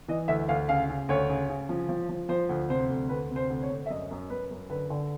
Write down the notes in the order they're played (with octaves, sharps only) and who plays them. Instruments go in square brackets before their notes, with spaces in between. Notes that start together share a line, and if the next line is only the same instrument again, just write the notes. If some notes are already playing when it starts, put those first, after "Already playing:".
[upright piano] E3 D#5
D2 E5
D2 F5
C#3 F5
C#3
D2 C#5
C#3
C#3
F3
F3
F3
F3 C5
D2
C3 C5
D2
D2 B4
C3
C5
D2
C#5
D2
E5
F#2 D#5
F#2
F#2 B4
F#2
D3 B4
D3